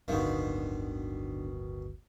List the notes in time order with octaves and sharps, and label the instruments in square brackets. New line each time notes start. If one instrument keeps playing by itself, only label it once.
[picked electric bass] D1 G1 [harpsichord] B2 D#3 [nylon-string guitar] D3 D#4 F4